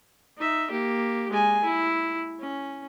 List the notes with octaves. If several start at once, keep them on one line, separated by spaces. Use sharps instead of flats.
D#4 E5
A#3 G4
G#3 G#5
E4
C#4